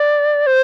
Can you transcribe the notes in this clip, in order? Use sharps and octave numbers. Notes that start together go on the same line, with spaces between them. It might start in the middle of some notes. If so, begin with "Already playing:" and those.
Already playing: D5
C5